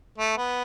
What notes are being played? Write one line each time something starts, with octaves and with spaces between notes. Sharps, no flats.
A3
B3